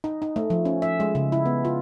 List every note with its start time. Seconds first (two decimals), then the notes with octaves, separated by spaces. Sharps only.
0.04 D#4
0.22 D#4
0.36 A3
0.50 F3
0.65 C#4
0.82 E5
1.00 G#3
1.15 C#3
1.32 E4
1.46 B3
1.65 F4